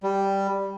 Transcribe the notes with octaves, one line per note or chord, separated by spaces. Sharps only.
G3